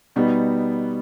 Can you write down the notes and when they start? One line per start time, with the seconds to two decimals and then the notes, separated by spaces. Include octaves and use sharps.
0.16 B2 G3 B3 D#4